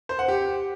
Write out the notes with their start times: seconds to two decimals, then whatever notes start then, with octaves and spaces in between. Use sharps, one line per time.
0.09 C5
0.19 F#5
0.28 G4